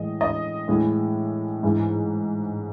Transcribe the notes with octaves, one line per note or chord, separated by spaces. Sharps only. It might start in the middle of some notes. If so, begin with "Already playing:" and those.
Already playing: A2 E3 G#3 D#5
D#5
A2 E3 G#3
G#2 E3 G#3